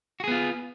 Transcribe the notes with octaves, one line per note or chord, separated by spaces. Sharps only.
B3 F4 F#4 G#4